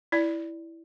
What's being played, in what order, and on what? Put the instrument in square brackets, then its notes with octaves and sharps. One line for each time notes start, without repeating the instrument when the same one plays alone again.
[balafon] E4 D5